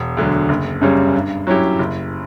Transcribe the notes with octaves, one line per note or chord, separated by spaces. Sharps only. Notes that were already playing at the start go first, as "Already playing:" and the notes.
Already playing: E1
D2 D3 F#3
F#1
F#2 C#3 G3 C#4
G2
F#3 C#4 E4 G4
F#1